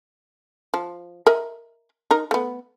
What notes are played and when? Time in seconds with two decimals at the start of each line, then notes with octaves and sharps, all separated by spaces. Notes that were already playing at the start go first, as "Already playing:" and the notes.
0.74 F3
1.27 A#4 D#5 E5
2.11 D#4 A#4
2.31 A3 B3